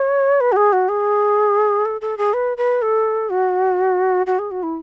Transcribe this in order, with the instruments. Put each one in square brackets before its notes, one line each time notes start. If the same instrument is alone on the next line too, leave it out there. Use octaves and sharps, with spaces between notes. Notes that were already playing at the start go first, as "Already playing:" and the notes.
Already playing: [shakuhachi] C#5
B4
F#4
G#4
F#4
G#4
A4
A4
G#4
B4
B4
A4
F#4
F#4
G#4
F#4
E4